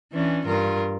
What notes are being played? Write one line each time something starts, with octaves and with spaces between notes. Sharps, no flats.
E3 C#4 D4
G2 F4 A#4